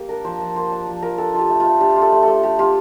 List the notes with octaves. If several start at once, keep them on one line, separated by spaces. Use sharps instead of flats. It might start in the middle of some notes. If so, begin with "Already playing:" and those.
Already playing: A#3 G4
D4 A#4
F3 C5
F3 D5
A#3 C5
D4
F3
F3 A#4
D4 A4
F4 G4
A3
F4
A3
D4 G4
F4
A4
A3
A3 A4
D4 G4
F4 G4